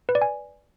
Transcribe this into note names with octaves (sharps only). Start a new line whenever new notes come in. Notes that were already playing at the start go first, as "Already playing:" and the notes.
B4
D5
G#5